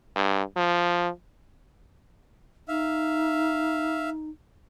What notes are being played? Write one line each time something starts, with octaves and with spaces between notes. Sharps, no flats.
G2
F3
D#4 E5 F5